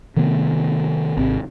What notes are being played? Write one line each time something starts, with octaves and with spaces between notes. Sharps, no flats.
C3 D#3 A3 B3
G#1 C3 C4